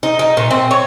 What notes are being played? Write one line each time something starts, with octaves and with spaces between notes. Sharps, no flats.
D#4
D#4
A#2
C4
C#5